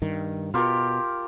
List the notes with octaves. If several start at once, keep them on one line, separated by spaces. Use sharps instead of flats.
G2 D#3
B2 F4 G4 A#4